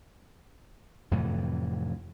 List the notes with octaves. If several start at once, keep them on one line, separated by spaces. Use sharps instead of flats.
F2 A2 C3 E3